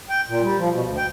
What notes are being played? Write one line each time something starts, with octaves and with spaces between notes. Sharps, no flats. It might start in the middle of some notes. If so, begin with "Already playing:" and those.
G5
A#2
G3
F3
B2
D2
G5